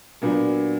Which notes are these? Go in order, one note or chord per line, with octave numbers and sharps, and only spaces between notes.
A#2 F#3 B3 D4